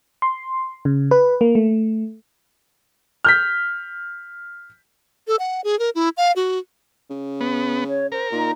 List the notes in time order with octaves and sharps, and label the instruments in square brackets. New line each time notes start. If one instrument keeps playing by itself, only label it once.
[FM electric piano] C6
C#3
B4
A#3
A3
[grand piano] F6 G6 B6
[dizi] A4
F#5
G#4
A#4
E4
F5
F#4
[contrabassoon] C#3
[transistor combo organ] B3
[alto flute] C#5
[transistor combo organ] A#4 [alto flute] C5
[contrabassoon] A#2 [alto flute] D#4